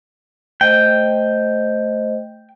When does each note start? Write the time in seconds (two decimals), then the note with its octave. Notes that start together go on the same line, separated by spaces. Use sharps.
0.61 A3 C5 D#5 G5